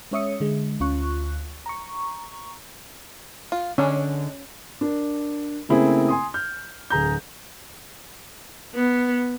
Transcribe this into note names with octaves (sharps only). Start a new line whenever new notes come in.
G#3 C#4 C#5 E5 D#6 C#7
D3 G#3
D2 C#4 F4 C#6 F#6
A#5 C#6
F4
D3 G#3 C#4 D4
D4 A#4
C#3 A3 A#3 C4 E4 G#4
G#5 C6 D#6
F6 G6
D1 G#4 A#5 G6
B3